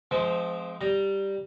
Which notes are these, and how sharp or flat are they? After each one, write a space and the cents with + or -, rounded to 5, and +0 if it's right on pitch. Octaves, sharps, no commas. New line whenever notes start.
F3 +0 G#3 +25 C4 -20
G3 +0 A#5 +0